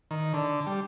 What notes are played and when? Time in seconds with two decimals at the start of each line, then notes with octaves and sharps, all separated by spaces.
0.11 D#3
0.34 D3
0.67 G3